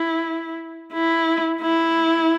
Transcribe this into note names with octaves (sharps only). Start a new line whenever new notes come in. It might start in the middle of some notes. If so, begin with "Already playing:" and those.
Already playing: E4
E4
E4